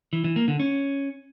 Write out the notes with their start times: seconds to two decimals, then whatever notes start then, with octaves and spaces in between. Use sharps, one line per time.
0.13 E3
0.24 E3
0.36 A#3
0.48 D3
0.60 C#4